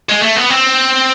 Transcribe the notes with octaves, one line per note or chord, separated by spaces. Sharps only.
G#3
A3
B3
C4